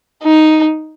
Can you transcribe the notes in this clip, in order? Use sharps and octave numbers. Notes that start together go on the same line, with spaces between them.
D#4